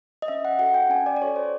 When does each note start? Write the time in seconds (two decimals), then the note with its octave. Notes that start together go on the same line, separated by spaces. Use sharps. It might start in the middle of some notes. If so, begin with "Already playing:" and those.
0.22 D#5
0.28 C#4 E5
0.45 F#5
0.59 F#4 A4 F#5
0.74 G5
0.90 C#4 G#5
1.06 D5
1.16 D5
1.21 F#4 A4 C#5
1.36 C5